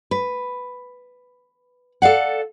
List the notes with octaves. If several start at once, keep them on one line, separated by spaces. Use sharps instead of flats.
B4
A4 D5 F5 F#5